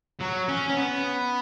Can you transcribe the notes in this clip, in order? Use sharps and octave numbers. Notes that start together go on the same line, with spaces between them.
F#3
C#4
C#4
B3